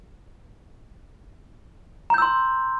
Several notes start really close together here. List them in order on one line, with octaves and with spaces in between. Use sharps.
A#5 G6 E6 C6